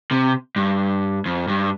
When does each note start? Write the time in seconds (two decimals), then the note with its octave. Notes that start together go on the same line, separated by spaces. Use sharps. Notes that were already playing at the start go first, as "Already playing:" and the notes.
0.11 C3
0.56 G2
1.26 F2
1.48 G2